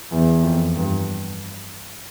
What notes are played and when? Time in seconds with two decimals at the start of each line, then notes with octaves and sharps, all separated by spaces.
0.12 E2
0.43 F2
0.76 G2